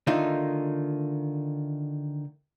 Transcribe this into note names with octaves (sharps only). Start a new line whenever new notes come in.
D3 D#3 A3 D#4 F4